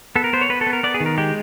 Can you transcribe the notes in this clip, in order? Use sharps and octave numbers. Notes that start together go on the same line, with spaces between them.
B3 A4
A#4
B3 C5
C#5
B3 B4
A4
B3
A#4
B3 D5
G#4
D#3
A#4
G#3 G4